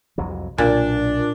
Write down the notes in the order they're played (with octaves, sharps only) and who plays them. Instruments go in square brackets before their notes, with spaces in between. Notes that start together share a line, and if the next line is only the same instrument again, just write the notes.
[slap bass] C2 F2 F#3
[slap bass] B1 [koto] A#2 [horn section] D4